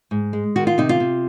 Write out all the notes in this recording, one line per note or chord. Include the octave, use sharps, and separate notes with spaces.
G#2
G#3
D#3 F#4
F4
C3 D#4
F4
C3